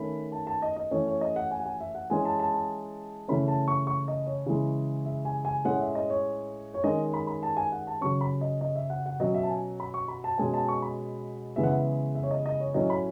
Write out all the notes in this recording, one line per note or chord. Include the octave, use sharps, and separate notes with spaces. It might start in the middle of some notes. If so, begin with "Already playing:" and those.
Already playing: D#3 A3 C#4 B5
A5
A5
D#5
D#5
E3 A3 C#4 C#5
C#5
D#5
F#5
G#5
F#5
G#5
E5
F#5
E3 G#3 C#4 G#5
A5
A5
A5
C#3 E3 A3 C#4 B5
A5
C#6
C#6
D#5
C#5
C#3 E3 G#3
E5
G#5
G#5
A2 G#3 C#4 F#5
E5
D#5
C#5
C#5
D#3 G#3 C#4 D#5
B5
B5
A5
G#5
F#5
A5
C#3 F#3 C#4 C#6
B5
D#5
D#5
E5
F#5
F#5
B2 F#3 C#4 D#5
E5
A5
G#5
B5
C#6
B5
A5
B2 G#3 C#4 G#5
A5
C#6
B5
C#3 E3 G#3 B3 E5
F#5
E5
E5
C#5
D#5
D#5
C#5
A2 F#3 C#4 D#5
B5